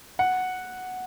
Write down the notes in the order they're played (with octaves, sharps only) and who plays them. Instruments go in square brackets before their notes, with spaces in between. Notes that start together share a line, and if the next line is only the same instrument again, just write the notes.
[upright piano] F#5